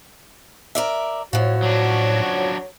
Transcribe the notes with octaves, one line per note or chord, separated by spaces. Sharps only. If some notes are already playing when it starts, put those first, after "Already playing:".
A#4 D5 E5
F#2 A2 F3 F#4 C#5
F#3 D4